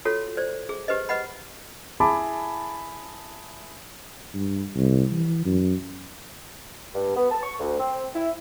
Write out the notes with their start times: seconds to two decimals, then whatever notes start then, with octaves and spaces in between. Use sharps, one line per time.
0.05 F4 F#4 A4 C#5
0.37 C5 D5
0.69 G#4
0.88 G4 B4 C5 D#5
1.09 B4 D#5 F#5 B5
2.00 E4 G#4 A5 B5 D6
4.34 G2
4.76 C2
5.12 E3
5.45 F#2
6.94 G2
7.16 B3
7.31 A5
7.43 C#6
7.60 D2
7.79 C4
8.14 E4